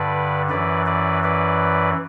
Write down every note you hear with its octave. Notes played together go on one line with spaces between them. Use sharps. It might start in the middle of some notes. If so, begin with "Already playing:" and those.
Already playing: G2 D3 B4 D5
F#2 E3 B4 D5
B4 D5
B4 D5